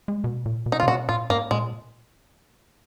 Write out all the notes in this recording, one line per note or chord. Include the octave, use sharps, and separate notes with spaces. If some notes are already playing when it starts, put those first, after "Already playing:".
G#3
B2
A#2
B2
D#4
F4
C#3
B2 F#4
A#2 F4
G#2 A#3
A#2 G#3